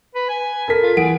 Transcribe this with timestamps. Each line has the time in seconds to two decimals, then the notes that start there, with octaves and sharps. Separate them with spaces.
0.15 B4
0.29 G#5
0.68 A4 A#4 B6
0.82 F4
0.97 E3 G#4 F#5 D7